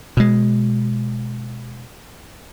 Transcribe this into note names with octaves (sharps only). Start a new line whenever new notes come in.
B2 G#3